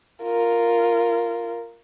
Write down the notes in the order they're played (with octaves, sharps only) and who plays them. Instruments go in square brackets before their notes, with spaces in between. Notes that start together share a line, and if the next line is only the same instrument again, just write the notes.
[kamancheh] F4 A#4